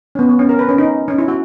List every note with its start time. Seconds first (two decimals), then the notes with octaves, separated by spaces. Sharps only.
0.15 C#4
0.19 B3
0.29 B3
0.39 C#4
0.49 A#4
0.59 B4
0.69 C#4
0.78 D#4
1.08 C#4
1.18 E4
1.28 F#4